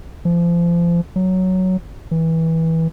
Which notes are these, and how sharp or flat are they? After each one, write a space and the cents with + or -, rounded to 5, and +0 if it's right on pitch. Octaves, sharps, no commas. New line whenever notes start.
F3 -30
F#3 +5
E3 -20